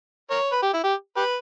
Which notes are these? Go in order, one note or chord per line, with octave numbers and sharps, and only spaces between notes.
A#4 C#5
B4
G4
E4
G4
G4 B4